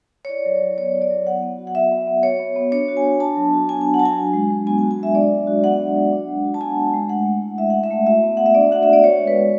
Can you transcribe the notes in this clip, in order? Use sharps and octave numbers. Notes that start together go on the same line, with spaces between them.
C#5
E4 D5
F#3
F#3
B3 C#5
E4
D5
F#3
B3 F#5
B3
F#4
F#5
F#4 E5
B3
B3
F#4 C#5
B3
B3
D4 C#5
F#4
G#5
B3
D4 A5
F#3
F#4
B3 G#5
G#5
D4
F#5
A5
F#3 G#5
F#4
G#3
G#3
B3 G#5
G#5
F#4
G#5
G#3 E5
D4 D5
F#3
F#4
B3 F#5
D4
F#3
D4
G#3
F#4
A5
B3 G#5
D4
G#3
A3 F#5
A3
E4
E4 E5
A3 F#5
E5
A3
F#4 E5
B3
B3 F#5
E5
D4 D5
F#4 F#5
B3 E5
D5
F#4 C#5
G#3
B4
G#3